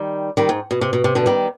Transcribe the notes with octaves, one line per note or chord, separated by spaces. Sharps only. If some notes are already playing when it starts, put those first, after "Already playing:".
Already playing: D#3 G3
D#3 G3
G#2
B2
C3
B2
C3
B2 D3
D#3 G3